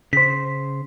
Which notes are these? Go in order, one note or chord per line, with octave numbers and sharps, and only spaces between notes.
C#3 C5 B6